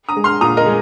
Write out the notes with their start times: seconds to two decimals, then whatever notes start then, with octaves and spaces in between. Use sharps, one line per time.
0.09 A#5 D#6
0.16 G#3
0.24 C6 F6
0.41 A#2 A#5 D#6
0.57 A#4 D#5
0.66 G#3